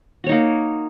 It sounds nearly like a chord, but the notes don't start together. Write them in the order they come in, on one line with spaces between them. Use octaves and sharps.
F#4 C#5 D#4 A#3